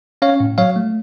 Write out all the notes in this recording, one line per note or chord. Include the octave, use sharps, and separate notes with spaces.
C#4 C#5 F5
A2
F#3 C#5 F5
A3